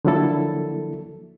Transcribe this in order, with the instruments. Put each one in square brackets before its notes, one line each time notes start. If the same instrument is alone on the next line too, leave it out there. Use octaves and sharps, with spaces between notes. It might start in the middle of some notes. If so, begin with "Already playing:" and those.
[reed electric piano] D3 F3 F#3 A#3 E4 A4